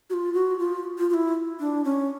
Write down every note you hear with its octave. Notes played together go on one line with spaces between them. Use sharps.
F#4
F4
F#4
F4
F4
F4
E4
D4
C#4